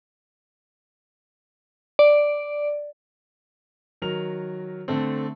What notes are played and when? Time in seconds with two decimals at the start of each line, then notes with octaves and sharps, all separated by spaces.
1.99 D5
4.02 D#3 F#3 A#4 F7
4.88 D3 A3 C4